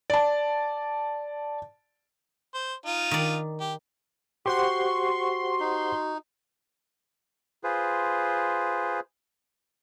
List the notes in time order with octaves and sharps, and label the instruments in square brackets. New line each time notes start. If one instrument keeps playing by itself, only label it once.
[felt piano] D5 A5
[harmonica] C5
D#4 F4
[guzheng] D#3 D5
[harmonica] G4
[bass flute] F#4 [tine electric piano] G4 C5 F#5 [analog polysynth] C6 [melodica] C#6
[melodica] D#4
[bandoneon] F4 G#4 B4 C5